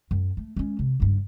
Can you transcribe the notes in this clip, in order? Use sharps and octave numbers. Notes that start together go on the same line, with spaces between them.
F#2
A3
G#3 C#4
C3
F#1 G2